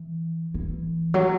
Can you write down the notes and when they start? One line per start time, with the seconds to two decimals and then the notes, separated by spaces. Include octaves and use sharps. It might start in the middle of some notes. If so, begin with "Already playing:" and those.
Already playing: E3
0.54 E3
1.14 F#3